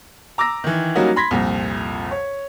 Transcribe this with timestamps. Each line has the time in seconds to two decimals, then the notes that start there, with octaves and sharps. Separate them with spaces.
0.38 A#5 D6 E6 A#6
0.64 D#3 E3
0.95 F#3 G3 A#3 C#4 D#4 F#4
1.16 B5 C6 G#6 A#6 B6
1.31 C2 F2 A#2
2.11 C#5